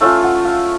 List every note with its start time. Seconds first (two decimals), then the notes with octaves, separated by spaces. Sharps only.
0.01 A3 C#4 F4 F5
0.23 F#5
0.44 F5